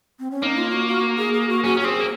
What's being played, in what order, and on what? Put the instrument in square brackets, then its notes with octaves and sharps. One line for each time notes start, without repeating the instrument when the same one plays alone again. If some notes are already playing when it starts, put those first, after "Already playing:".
[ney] C4
C#4
[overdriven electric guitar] A#3 [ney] D#4
[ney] F4
F#4
F#4
G#4
G#4
F#4
[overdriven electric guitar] C#4 [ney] F#4
[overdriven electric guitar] C#4
[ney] F#4
[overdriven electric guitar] C4 [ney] G#4
[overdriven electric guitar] A#3